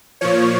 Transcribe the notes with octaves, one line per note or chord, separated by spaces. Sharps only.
A#2 F3 C#5